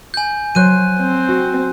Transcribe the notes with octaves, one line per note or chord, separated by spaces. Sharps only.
G#5 G6
F#3 C5 C#5 F#6 D#7
C4
F#4